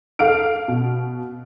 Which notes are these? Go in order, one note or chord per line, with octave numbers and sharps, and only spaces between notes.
A4 F5 F6 D7
B2